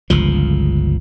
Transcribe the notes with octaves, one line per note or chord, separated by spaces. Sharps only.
G1 C#2 F3